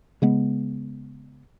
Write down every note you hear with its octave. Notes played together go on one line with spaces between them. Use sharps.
C#3 G#3 B3